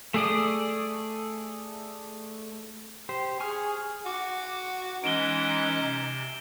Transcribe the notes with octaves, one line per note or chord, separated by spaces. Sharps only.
A3 G#4 D5 D#6
G4 C5
G#4 G#5 C#6 F6
F#4 D6
E3 G#3 C#4 D#4 D7 E7 G7
C3